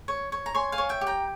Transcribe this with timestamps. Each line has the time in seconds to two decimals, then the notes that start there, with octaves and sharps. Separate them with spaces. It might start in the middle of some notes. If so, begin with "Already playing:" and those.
0.08 C#5
0.32 C#5
0.46 A#5
0.54 C#5 G#5 C6
0.72 F5 G#5
0.78 C#5
0.89 E5 G5
1.01 G4
1.06 G5 A#5